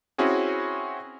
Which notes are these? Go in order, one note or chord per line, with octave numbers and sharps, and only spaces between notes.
C4 C#4 E4 F#4 G#4